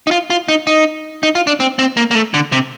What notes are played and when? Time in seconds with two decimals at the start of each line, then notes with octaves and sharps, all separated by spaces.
0.07 D#4
0.11 F4
0.30 F4
0.48 D#4
0.67 D#4
1.23 D#4
1.35 F4
1.47 D4
1.60 C4
1.79 C4
1.97 A#3
2.11 A#3
2.15 A3
2.34 D3
2.52 C3